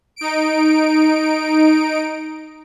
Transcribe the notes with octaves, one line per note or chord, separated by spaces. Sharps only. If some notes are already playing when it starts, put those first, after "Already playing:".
D#4 D7